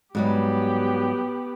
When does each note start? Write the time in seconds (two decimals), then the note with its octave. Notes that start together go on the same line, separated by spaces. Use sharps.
0.15 G#2 F#3 G3 B3 G4